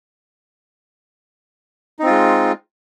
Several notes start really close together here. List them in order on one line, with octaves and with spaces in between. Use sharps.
D#4 C4 F4 G#3